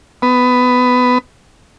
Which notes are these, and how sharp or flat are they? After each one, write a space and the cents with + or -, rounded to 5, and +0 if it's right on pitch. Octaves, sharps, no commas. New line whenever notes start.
B3 +15